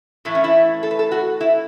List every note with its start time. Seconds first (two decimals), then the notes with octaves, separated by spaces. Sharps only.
0.25 A2 E3 A3 E4
0.35 C#4
0.44 E4
0.83 A4
0.91 B4
0.99 A4
1.12 F#4
1.41 E4